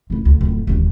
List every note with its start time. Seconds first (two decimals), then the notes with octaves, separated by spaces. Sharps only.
0.10 A3 E4
0.25 D2
0.41 D1 F2
0.67 E1 D#2